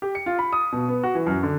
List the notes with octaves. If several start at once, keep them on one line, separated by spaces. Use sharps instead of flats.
G4
C#7
F4
B5
D#6
B2
B3
F#4
E3
F#2
D3